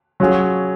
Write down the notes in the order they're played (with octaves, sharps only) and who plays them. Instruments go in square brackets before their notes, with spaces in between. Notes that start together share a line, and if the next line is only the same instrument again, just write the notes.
[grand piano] F#3 C#4 F4 G#4